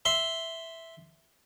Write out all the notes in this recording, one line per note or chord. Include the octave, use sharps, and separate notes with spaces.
E5 C6